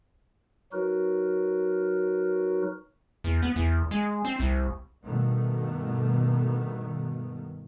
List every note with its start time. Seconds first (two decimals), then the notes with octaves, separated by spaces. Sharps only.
0.73 F#3 D#4 F#4 A#4 B4
3.24 E2
3.42 B3
3.56 E2
3.91 G#3
4.25 C4
4.40 C2
5.03 G2 B2 D#3 A3 B3